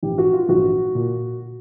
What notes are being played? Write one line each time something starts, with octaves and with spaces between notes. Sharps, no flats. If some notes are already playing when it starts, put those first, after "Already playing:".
A#1 G#2 E3 G4
F#4
F4
A#1 G#2 E3 F#4
A#2